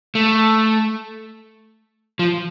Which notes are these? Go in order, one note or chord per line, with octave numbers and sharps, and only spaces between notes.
A3
F3